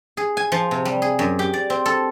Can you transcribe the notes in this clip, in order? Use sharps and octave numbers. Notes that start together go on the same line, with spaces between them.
G#4
G#5
F3
C3
G3
G#4
F#2
G4
D5
C4
A4